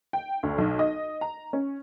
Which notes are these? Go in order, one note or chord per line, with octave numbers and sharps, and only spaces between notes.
G5
D2
B1
D#5
A#5
C#4